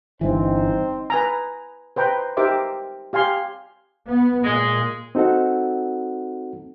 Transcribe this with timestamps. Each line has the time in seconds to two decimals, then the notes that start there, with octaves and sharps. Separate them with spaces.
0.21 G1 G2 E3 C4 D#4 C5
1.10 B4 G#5 A#5
1.96 B4 C5 G5 A#5
2.37 D#4 G4 A#4 C5 E5 D6
3.13 G4 F5 G#5 C6
4.08 B3
4.44 A#2 G#3
5.15 C4 D#4 F#4 A4 F#5